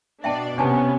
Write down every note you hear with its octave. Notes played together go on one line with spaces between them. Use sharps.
B2 D4 D5 E5 G5 A5
C3 B3 C#4 D4 G#5 A5